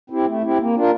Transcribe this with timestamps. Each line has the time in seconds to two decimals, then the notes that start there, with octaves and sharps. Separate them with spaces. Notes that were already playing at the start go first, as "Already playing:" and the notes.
0.10 C4 E4 G4
0.26 A3
0.42 C4 E4 G4
0.59 A#3
0.75 D4 F4 A#4